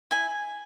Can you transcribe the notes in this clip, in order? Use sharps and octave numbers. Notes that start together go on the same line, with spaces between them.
E4 G#5